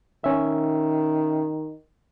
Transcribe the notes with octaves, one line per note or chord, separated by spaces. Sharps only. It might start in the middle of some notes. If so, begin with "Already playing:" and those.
D#3 C#4 E5